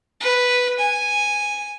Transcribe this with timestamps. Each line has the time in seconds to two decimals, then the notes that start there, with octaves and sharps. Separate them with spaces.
0.20 B4
0.79 G#5